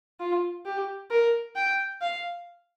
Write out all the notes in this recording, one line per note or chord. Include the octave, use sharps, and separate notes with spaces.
F4
G4
A#4
G5
F5